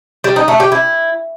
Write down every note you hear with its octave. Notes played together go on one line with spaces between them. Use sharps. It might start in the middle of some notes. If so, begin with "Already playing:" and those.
G3
D#4
A3
G4
E4